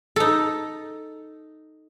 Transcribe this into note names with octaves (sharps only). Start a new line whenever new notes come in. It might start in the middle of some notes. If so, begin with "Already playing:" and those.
D#4 A4